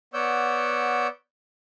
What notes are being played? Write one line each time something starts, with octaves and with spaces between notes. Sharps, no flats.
B3 C#5 D5 F#5 E6 G6